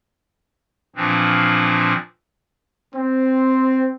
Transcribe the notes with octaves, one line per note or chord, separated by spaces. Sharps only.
A#2 E3 F3 C4 D4
C4